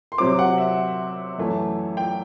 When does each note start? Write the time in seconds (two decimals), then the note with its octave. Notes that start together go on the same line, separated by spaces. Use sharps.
0.12 C6
0.18 C3 F#3 C4 D6
0.39 F#5
0.58 E5
1.38 F#2 E3 A3
1.97 G5